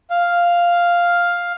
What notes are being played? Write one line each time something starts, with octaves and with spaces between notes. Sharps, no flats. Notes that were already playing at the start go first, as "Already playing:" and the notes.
F5